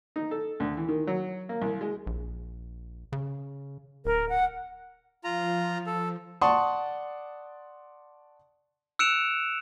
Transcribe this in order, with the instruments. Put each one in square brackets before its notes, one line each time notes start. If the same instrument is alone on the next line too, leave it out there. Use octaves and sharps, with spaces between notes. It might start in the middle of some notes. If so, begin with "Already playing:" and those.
[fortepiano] D#4
A4
D2
E3
D#3
F#3
A#3
C2
G#3
[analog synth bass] A#1
C#3
[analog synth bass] D1 [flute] A#4
[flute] F#5
[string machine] F3 [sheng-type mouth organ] F4 A#5
[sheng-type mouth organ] A4
[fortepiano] D5 F#5 A5 C6 C#6 D#6
[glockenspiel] E6 F#6 C#7 D7 E7 F7